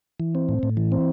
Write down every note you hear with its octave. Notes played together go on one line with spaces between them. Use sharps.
E3
C4
A2
A2
E3
C4